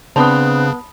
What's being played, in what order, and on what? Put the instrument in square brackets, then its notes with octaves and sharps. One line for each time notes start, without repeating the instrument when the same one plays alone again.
[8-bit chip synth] C#3 [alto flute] B3 [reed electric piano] C4 D4 C5 [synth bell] A5 B5 D#6